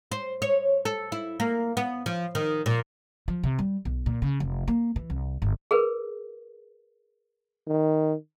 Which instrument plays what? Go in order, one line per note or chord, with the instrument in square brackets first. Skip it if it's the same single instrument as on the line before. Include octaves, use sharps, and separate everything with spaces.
[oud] C5
C#5
A4
E4
A#3
B3
F3
D#3
A#2
[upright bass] F3
C3
G3
B1
A#2
C#3
F1
A#3
E3
C2
G1
[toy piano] G#4 A#4 B4
[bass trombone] D#3